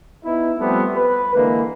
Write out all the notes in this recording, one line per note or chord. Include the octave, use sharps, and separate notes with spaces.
B3 D#4 E4
F3 G3 A3 B3 C4
B4
D3 E3 G#3 A#3